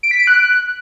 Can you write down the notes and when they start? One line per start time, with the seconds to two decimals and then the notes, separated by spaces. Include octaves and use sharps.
0.03 D7
0.11 B6
0.19 D7
0.27 F#6